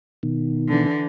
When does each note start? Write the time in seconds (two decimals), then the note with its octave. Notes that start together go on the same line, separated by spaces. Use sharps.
0.23 B2 D#3
0.68 D3 E3